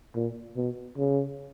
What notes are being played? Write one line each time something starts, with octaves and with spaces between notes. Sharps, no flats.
A#2
B2
C#3